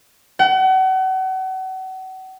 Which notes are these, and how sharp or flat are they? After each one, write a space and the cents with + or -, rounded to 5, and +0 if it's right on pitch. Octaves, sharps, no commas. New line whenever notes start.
F#5 +35